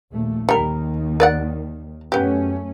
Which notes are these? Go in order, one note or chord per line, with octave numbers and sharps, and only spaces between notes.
A#1 D#2 A3
D#2 D#3 G3 A#4
A#4 D5 F#5
F#2 A3 B3 C#4 G4